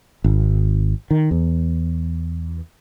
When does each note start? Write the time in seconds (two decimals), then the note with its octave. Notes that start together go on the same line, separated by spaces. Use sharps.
0.24 G#1
1.11 D#3
1.31 E2